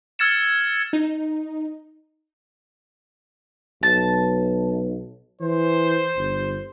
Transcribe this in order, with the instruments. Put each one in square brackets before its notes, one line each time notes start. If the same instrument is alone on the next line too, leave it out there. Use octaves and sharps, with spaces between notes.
[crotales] E6 F6 G#6 A6 C#7 E7
[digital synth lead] D#4
[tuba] B1 [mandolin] A5
[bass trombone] E3 [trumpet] C5
[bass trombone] G1